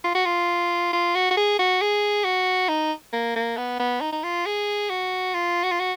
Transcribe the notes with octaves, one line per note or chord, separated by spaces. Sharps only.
F4
F#4
F4
F4
F#4
F#4
G#4
F#4
G#4
F#4
D#4
A#3
A#3
B3
B3
D#4
D#4
F4
G#4
F#4
F4
F#4
F4
F#4